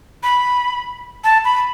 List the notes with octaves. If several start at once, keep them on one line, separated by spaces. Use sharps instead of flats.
B5
A5
B5